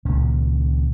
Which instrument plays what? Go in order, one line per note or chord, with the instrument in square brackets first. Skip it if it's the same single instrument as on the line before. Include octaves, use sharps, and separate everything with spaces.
[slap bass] C#2 A#2 D#3 C#4